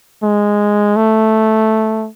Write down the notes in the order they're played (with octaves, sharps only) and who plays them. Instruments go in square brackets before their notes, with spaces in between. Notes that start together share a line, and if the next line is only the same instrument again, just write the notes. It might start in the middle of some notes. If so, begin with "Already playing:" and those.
[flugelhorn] G#3
A3